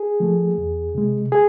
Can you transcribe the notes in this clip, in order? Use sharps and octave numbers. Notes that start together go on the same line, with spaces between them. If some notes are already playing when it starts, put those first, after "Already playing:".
Already playing: G#4
F3 A3
E2
C3 G#3
G#4